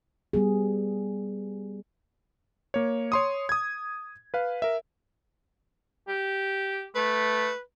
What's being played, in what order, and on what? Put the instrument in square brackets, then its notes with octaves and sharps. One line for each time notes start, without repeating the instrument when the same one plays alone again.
[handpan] G3 B3 G#4
[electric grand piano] A#3 C#5
C#5 C6 D#6
D#6 G#6
B4 F5
A#4 E5
[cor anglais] G4
[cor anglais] A3 [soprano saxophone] B4